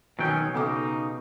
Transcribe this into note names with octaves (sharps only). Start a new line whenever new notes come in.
B2 D#3 F#3 A3 C#4 G5
C#3 B3 D#4 A4 D6